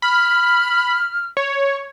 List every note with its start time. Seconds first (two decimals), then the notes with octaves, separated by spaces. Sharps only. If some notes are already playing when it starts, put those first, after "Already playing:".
0.02 B5 F6
1.37 C#5